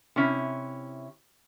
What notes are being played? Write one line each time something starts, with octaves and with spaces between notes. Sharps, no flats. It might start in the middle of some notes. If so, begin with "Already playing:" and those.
C3 C#4 E4